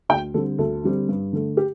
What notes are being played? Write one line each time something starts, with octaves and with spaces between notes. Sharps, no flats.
D2 G5
D3 G3 C4 A4
D2 A4
D3 G3 C4
G2
D3 A3
G4